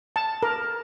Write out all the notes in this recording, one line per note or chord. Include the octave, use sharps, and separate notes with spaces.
A5
A#4